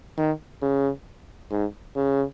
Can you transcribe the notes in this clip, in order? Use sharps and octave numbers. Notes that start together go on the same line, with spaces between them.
D#3
C#3
G#2
C#3